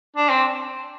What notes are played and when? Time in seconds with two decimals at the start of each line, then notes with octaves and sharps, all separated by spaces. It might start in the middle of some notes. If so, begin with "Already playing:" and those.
0.16 D4
0.30 C4